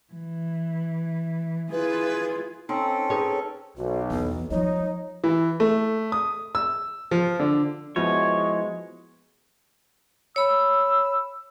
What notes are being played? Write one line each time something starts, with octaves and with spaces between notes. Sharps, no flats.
E3
E4 F4 G#4 B4
C4 C#4 D#4 A4
D#4 G#4 B4 C#5
B1 F#4
E2 E3 B3
F3 G#3 D#4 C#5
E3
A3
D#6
E6
F3
D3
F3 G#3 B3 E4 F#4 C#5
C#5 B5 E6